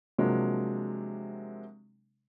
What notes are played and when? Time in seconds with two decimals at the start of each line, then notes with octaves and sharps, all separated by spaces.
0.18 C3 F3 F#3 G#3 A#3 D4